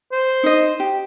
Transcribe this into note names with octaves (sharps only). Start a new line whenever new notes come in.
C5
D#4 D#5
G4